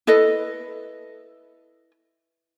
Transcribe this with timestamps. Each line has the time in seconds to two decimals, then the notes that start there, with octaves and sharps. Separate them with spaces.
0.07 E4 A4 B4 D#5